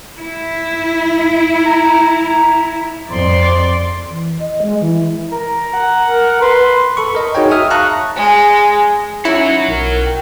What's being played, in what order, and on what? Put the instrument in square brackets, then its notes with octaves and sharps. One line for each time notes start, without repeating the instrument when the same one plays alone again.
[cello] E4
[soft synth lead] A#5
[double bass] F2 [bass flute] C5 [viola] D5 [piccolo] C6
[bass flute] E3
D#5
G#3
E3
[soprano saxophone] A#4 [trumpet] A#5
[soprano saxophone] F#5
[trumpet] A#4
[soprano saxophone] B4 [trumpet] C6
[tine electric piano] A4 B5 C#6
A#4 D#5
D#4 F#4 G#4 C#5 D#5 G5
E5 D#6 F6
F5 A5 A#5 C#6 F#6
[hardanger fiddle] G#3
[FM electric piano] C#4 [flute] D#4 [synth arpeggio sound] E4 [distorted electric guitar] F#4 C#5
[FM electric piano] B1 [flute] A#4
[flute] G5